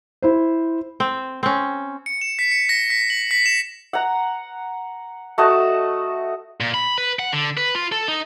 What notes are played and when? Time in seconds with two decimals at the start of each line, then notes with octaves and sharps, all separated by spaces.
0.22 E4 C5
1.00 C4
1.43 C4 C#4
2.06 C#7
2.21 E7
2.39 B6
2.51 C#7
2.69 A#6
2.90 B6
3.10 F#7
3.31 B6
3.46 E7
3.93 F#5 A#5
5.38 A3 F#4 D#5 A5
6.60 A#2
6.74 B5
6.98 B4
7.19 F#5
7.32 D3
7.57 B4
7.75 F4
7.92 A4
8.08 D#4